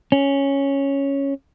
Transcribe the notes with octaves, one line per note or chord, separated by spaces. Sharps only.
C#4